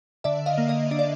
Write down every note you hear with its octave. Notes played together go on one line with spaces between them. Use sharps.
D3 D5 E5
D#5 F5
A#3
D#5
D4 D#5
D5